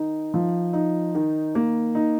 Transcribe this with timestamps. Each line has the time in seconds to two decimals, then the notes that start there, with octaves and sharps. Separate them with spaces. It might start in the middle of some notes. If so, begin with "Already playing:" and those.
Already playing: D#3 D#4
0.34 F3
0.73 D#4
1.15 D#3
1.55 A#3
1.95 D#4